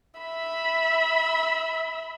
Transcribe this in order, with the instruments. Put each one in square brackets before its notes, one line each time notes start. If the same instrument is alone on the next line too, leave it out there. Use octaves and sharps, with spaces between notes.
[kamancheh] E5 B5